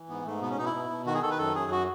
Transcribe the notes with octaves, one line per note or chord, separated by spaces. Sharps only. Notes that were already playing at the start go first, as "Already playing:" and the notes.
Already playing: E3
G#2 B3
G#2 A3
B2 B3
C#4
B2 D#4
E4
B2
B2
D#3 F#4
G#4
D#3 A4
B4
F#2 A4
F#2 G#4
F#4